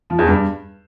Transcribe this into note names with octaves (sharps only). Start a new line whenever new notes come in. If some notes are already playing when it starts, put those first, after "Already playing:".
F3
E2
G2